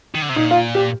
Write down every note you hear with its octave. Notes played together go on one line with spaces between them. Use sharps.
D#3
D3
C3
A#2 D#4
F4
G4